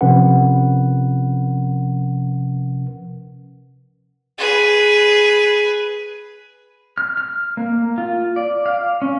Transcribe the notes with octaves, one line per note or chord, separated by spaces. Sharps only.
C3 F3 C#4 A#4 B4 F#5
G#4 B4
F6
F6
A#3
F4
D5
F5
C#4